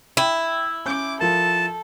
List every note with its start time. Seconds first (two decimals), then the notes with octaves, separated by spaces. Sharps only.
0.17 E4 G5
0.86 C#4 D6 G6
1.20 F3 A4 A#4 A5